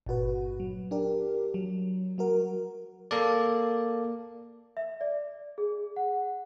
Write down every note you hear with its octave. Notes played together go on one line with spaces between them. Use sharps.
G1 A#2 F#4 B4
F#3
D4 G4 A#4
F#3
F#3 F#4 A#4
A#3 A4 D5
E5
D5
G#4
F#5